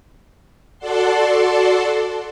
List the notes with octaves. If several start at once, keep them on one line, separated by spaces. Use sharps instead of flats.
F#4 A4 D5 F#5 A5 C6